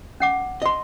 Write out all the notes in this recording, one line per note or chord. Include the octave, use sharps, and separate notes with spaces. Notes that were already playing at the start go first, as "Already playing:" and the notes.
C#4 F#5 D6
D#5 C6